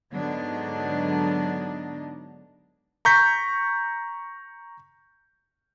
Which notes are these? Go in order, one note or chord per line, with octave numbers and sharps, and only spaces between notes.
G#2 D3 F#3 B3 D4 D#4
A#5 C#6 G6 B6